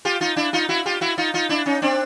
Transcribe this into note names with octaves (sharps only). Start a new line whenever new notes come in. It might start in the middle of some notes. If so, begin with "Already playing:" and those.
F4 G4
D#4 F4
D4 E4
D#4 F4
E4 F#4
F4 G4
E4 F#4
D#4 F4
D#4 F4
D4 E4
C#4 D#4
C4 D4